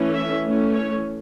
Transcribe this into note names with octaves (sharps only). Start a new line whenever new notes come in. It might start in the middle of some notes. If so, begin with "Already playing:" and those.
Already playing: E3 A3 C#4
E5
E3 A3 C#4
C#5